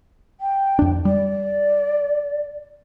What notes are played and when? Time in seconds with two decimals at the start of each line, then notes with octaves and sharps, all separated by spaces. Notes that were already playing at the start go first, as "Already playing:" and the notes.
0.41 G5
0.79 F2 D4
1.05 G3 D5